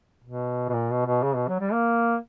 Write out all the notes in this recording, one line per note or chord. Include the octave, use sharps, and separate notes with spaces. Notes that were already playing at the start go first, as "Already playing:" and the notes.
B2
B2
A#2
B2
B2
C#3
B2
F#3
G3
A#3